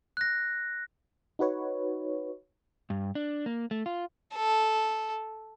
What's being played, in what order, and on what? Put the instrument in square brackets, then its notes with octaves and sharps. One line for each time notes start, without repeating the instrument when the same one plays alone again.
[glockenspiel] F#6 A#6
[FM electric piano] D#4 F#4 B4 C#5
[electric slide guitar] G2
D4
A#3
A3
F4
[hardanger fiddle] A4